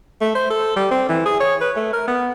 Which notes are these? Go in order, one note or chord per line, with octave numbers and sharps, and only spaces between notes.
A3
C5
A4
G3
C4
E3
G#4
C#5
B4
A3
A#4
B3